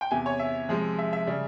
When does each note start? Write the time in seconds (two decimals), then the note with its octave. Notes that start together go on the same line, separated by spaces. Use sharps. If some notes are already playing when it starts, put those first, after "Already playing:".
0.01 G5
0.11 E2 C3 E3 G#5
0.26 C#5
0.39 E5
0.69 C3 F3 G#3
0.99 E5
1.13 E5
1.27 C#3 G3